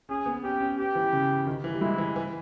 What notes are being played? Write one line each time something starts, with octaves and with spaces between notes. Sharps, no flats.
C#4 G#4
B3
C#4 G4
C#4
G4
E3
C#3
D#3
E3
G3
G#3 E4
E3
E3